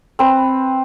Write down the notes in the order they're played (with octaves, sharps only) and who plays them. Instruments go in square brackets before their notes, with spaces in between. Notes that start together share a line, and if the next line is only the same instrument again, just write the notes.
[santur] C4 B4